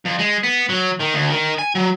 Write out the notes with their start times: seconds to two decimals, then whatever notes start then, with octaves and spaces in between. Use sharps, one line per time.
0.06 F2
0.19 G#3
0.44 B3
0.69 F#3
0.99 D#3
1.14 D2
1.30 D#3
1.59 G#5
1.75 F#3